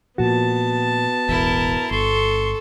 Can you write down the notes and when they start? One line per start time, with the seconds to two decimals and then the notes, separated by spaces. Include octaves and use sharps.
0.18 A#2 F3 B3 F#4 A5
1.29 E1 A1 E2 E4 A#4
1.91 G1 A4 C6 C#6